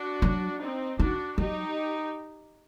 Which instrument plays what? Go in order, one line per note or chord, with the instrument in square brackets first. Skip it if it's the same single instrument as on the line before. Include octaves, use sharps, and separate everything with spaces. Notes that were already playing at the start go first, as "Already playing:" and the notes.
Already playing: [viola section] D4 F#4
[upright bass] F#3
[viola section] C4 D#4
[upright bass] D#3 [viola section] D4 F#4
[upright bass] F#3 [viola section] D#4 G4